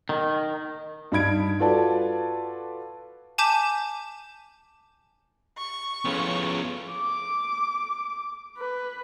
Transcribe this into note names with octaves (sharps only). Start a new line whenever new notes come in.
D#3
G2 D#4 B5 G#6 D7
F4 F#4 A4 B4 D5 A5
G#5 A5 D6 G6 B6 E7
C#6
A2 C#3 F3 B3 F4
D6
B4